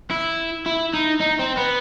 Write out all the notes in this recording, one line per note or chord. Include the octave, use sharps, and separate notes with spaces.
E4
E4
D#4
D#4
C4
B3